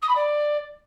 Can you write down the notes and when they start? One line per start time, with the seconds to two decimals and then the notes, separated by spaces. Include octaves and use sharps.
0.02 D#6
0.08 B5
0.15 D5